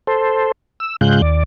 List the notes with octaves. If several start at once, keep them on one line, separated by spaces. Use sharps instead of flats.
A4 C5
E6
G#2 C#3 G#3 F4 F#6 G6
D#2 D5